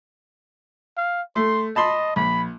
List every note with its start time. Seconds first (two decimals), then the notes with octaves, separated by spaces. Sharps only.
0.97 F5
1.36 A3 C6
1.76 D#5 A5 B5 C6
2.16 A#1 B5